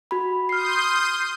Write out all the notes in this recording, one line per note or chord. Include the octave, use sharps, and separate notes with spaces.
F#4 B5
C6 D#6 F6 G6 C7